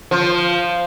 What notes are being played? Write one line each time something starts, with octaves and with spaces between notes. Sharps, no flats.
F3